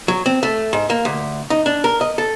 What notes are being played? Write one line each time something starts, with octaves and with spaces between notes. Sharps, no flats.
F#3
C4
A3
G#2
A#3
D2
D#4
D4
A#4
D#5
A4